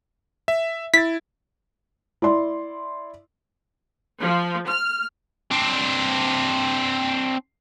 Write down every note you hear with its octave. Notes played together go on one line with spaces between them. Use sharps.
E5
E4 A6 B6
E4 D5 C6
F3
F6
C4 D4